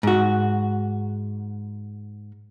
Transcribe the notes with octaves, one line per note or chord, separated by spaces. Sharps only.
G#2 F#4